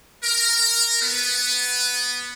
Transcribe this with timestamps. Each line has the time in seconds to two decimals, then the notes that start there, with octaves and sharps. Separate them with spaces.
0.24 A#4
1.02 B3